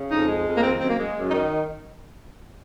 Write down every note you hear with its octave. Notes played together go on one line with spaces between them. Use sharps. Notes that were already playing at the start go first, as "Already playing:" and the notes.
Already playing: C#3
F2 D#4
G#3
F2
A#3
D#3 C4
F#2 C4
A#3
G#3
F#2
D#4
D#3